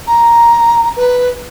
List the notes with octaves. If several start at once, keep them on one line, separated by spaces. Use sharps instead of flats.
A#5
B4